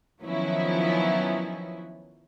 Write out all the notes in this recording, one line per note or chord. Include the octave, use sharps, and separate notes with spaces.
D#3 F3 F#3 B3 C#4 E4